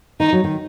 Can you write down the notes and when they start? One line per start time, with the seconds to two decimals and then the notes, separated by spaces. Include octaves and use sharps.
0.20 D#3 D#4
0.33 F#3
0.44 D#3